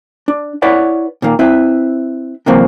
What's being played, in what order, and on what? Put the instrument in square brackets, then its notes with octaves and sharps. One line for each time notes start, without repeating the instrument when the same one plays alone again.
[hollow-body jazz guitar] D4
E4 B4 C#5 D5 F#5
A#2 D#3 A#3
C4 E4 B4 E5
C3 E3 F#3 A#3 C4